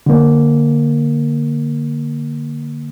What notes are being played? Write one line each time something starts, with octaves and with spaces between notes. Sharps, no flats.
D3 A#3